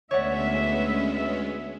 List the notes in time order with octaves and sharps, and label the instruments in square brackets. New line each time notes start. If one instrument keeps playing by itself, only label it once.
[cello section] D2 E5 [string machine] G#3 B3 C#4 [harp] C#5 D5 F#5